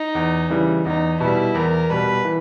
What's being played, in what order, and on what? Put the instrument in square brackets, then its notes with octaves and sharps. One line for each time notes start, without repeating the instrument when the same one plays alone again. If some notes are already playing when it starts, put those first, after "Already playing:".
Already playing: [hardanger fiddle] D#4
[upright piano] E2
C#3 E3 G3
[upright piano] E2 [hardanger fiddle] D#4
[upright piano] B2 G3 [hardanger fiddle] E4
[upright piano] E2 [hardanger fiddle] A#4
[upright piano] B2 G3 [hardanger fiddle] B4
[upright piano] E3